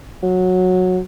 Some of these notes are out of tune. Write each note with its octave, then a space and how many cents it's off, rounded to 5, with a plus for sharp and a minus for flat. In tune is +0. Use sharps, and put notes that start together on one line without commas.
F#3 -10